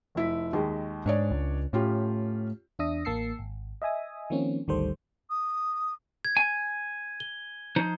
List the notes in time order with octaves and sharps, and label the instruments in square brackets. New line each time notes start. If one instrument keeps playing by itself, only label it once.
[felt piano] F1 E4 B6
D#2 D#3 G#3
[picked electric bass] G#2 [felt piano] D4 C#5 D5
[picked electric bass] C#2
[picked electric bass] A2 [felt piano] C#4 F4 G4
[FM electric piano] E2 D4 E5 D#6 A#6
A1 A#3 A5 E6 C7 C#7
G#1
D#5 E5 G#5 D#6
D#3 F3 A#3 C4 C#4
G#1 D2 D#3 G3 A4 C5
[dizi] D#6
[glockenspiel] G#6
[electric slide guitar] G#5
[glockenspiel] G7
[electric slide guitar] F3 D#4 C5